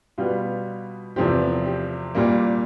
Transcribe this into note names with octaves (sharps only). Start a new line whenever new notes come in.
B2 G3 B3 F4
E2 C3 F3 A3 C4 G4
G4
A#2 G3 A#3